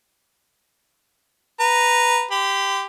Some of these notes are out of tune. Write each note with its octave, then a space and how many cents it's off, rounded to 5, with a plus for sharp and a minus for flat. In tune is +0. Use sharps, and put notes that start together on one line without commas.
B4 +0 A#5 +0
G4 +0 C6 -45